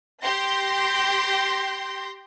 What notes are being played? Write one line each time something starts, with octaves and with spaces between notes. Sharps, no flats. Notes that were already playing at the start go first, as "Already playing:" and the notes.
G4 C6 G6 A#6